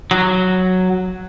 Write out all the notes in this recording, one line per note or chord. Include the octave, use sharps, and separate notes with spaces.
F#3